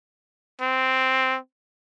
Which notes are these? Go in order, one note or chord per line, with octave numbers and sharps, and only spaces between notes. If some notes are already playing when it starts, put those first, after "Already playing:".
C4